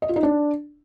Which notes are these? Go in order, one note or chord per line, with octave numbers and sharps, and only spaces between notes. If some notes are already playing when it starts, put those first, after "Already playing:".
D#5
F4
D#4
D4